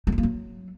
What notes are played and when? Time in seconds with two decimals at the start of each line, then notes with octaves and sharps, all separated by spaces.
0.07 A3
0.12 C4
0.18 A#3
0.23 F#3